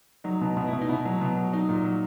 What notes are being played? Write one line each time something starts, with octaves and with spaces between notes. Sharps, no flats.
F#3 D#4
B2
B2
E4
B2
D#4
B2 E4
F#3
B2
F#3
F#3 D#4
A#2
F#3